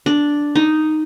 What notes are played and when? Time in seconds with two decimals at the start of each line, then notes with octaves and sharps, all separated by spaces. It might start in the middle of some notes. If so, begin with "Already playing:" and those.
0.06 D4
0.55 D#4